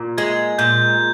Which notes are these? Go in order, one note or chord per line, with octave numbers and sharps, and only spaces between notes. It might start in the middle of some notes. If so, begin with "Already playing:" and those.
Already playing: A#2
G#3 G#6
A#2 G6